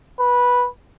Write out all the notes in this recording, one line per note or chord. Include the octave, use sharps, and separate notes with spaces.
B4